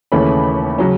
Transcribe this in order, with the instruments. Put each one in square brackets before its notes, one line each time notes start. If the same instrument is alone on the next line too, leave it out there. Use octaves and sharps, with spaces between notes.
[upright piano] D#2 C#3 E3 A3 C#4 B5
C#3 F#3 C#4